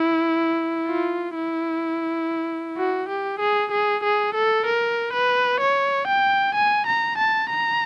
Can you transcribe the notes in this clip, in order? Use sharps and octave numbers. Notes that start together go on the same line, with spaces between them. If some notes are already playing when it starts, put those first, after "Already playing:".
Already playing: E4
F4
E4
F#4
G4
G#4
G#4
G#4
A4
A#4
B4
C#5
G5
G#5
A#5
A5
A#5